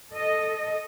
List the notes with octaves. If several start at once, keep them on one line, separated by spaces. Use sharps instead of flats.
A4 D#5